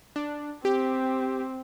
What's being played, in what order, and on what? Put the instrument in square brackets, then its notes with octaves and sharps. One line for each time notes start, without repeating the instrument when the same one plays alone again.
[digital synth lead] D4
[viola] C4 [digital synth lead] G4